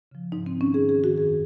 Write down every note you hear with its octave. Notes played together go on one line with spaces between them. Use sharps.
C#3 F3
G#2 D#4
C4
D#3
C#4
G#2 G#4
G#4
D#3
F#4
F#2 G#4